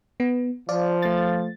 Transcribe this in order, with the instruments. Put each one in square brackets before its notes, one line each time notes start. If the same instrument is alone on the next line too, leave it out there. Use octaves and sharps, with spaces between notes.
[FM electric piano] B3
[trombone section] F3 [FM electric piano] D5 F5
[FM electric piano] A3 A6